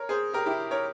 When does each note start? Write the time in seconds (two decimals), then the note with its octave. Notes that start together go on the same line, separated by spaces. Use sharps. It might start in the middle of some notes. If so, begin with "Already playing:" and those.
Already playing: A#4 C#5
0.09 G#4 C5
0.34 G4 A#4
0.46 E4 G4
0.71 A#4 C#5